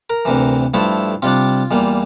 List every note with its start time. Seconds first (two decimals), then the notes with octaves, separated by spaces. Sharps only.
0.10 A#4
0.25 D2 C3 E3
0.74 G2 F3 A3 E4 A4
1.22 C3 G3 D4 F4
1.71 E2 E3 G3 A#3